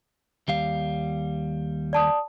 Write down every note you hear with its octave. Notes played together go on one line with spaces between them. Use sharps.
D#2 G3 F5
D5 A5 D#6